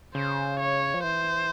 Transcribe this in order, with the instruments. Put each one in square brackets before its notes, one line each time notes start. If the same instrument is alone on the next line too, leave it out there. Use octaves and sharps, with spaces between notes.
[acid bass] C#3 [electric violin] C5
[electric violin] C#5
[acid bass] F3
[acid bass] E3 [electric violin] C5